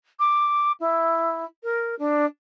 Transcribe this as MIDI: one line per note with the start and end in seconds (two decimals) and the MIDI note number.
0.19 0.72 86
0.80 1.45 64
1.63 1.95 70
1.99 2.25 62